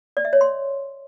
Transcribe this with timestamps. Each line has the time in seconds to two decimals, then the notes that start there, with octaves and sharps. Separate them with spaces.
0.17 D5
0.25 E5
0.33 C#5
0.41 C6